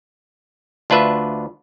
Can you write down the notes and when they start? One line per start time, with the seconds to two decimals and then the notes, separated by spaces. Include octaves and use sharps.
0.90 D2 D4 F4 B4 E5